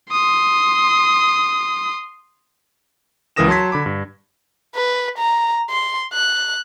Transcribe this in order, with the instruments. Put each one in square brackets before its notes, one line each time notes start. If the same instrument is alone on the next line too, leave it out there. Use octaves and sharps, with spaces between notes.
[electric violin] C6 D#6
[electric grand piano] C#2 E3 A#4 D#6 A#6 E7
F#3 A5 C6 G#6 B6
D3 B5 D6
G2
[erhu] B4
A#5
C6
F#6